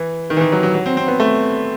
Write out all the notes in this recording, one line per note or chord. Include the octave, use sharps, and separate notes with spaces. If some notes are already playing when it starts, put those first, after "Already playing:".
Already playing: E3
D#3
E3
D#3
F#3
F#3
F#3
C4
C4
B3
A3